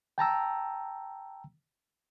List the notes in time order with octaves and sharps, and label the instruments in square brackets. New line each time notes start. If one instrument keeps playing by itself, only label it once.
[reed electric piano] G5 A5 A#5 E6